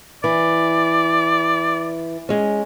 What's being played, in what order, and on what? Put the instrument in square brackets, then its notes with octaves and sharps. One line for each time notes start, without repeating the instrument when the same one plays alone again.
[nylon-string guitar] E3 [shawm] D5
[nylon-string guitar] G#3 C#4